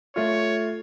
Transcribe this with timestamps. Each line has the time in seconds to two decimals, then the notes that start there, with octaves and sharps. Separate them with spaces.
0.16 A3 F4 C#5